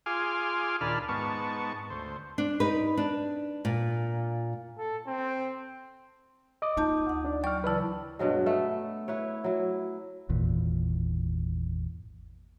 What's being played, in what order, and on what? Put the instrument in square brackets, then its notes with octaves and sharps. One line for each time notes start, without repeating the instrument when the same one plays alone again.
[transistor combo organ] F4 G#4 G#5 C6 D6 F6
D#2 A#2 D4 A5 B5 F6
G#2 B3 A5 C#6
D2 C5
[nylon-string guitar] D4
D#4 B4
D4
A#2
[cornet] A4
C4
[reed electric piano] D#5 D6 D#6
[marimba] A#3 A5 G6 [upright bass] D#4 F4
[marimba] D2 F#5
[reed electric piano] D4 D5
[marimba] F#3 D5 C#6 [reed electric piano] G5 F6
[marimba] C#3 E3 E4 [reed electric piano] B4 D5 A5
[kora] G2 B2 F#3 G#3
A3 B3
E4 B4 C#5
F#3 E4
[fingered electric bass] G#1 E2 A#2